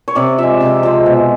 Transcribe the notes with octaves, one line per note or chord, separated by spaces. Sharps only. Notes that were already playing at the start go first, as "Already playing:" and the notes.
C#5
C3 D5
F3 G#3 E5
C3
F3 G#3
B2